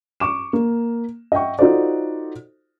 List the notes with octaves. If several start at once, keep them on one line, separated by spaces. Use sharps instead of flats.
C#6 D6 E7
A#3
D#5 E5 F#5 G5 C#6
D#4 F4 F#4 A4 C5 D5